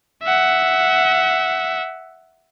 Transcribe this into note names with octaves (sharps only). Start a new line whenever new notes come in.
E5 F#5